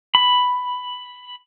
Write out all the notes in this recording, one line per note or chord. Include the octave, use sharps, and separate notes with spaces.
B5